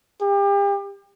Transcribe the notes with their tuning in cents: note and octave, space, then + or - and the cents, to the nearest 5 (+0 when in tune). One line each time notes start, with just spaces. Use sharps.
G4 +35